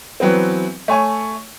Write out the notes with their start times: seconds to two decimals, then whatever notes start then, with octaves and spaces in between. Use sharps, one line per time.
0.20 E3 F#3 B3 C4
0.88 A3 C#5 G#5 C#6